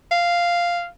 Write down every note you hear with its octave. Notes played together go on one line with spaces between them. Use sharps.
F5